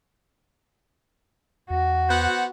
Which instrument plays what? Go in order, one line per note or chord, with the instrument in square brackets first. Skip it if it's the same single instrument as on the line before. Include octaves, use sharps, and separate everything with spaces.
[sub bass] E2 [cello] F#4
[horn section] B3 C5 F#5